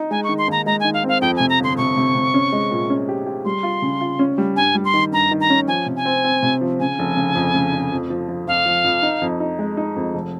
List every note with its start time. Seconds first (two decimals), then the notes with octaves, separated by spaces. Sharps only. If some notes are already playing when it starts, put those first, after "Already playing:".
Already playing: D#4
0.11 G#3 G#5
0.24 C#6
0.29 D#3
0.38 C6
0.48 D#2 A#5
0.66 G#3 A#5
0.80 D#3 G#5
0.94 F5
1.04 C4 F5
1.21 F2 G5
1.36 C3 G#5
1.49 A#5
1.59 G1 C6
1.77 C3 C#6
1.96 C3
2.15 C3
2.34 C#4
2.53 G#3
2.71 A#2
2.90 C#4
3.08 G4
3.26 G4
3.45 G3 C6
3.63 F4
3.82 C#3
4.01 F4
4.19 C#4
4.38 G3
4.56 G2 G#5
4.75 G3
4.85 C6
4.94 D#3
5.12 G2 A#5
5.31 D#3
5.41 A#5
5.50 C#4
5.68 F3 G#5
5.86 C3
5.96 G#5
6.05 C4
6.24 C4
6.42 C3
6.61 F3
6.80 C#3 G#5
6.99 F1
7.17 C#3
7.35 F2
7.55 C#3
7.73 F1
7.92 F2
8.10 F3
8.28 F3
8.47 F2 F5
8.65 F3
8.84 F2
9.03 D#4
9.22 F2
9.40 D#4
9.59 G#3
9.77 D#4
9.96 F2
10.14 F1